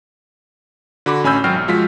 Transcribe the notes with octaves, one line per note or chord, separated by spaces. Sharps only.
D3 F#4 B5 D6
A1 C#4 G#5 B5 E6 G6
G#1 F#3 F#4 G5 F6 C7
B1
F3 G#3 F4 F#4 B6